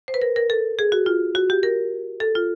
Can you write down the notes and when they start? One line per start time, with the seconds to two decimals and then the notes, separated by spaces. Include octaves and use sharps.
0.08 C5
0.14 B4
0.22 A#4
0.36 A#4
0.50 A4
0.79 G#4
0.92 F#4
1.06 F4
1.35 F#4
1.50 G4
1.63 A#4
2.20 A4
2.35 F4